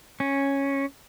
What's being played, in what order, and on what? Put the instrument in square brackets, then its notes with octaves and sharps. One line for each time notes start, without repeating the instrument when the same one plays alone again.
[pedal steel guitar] C#4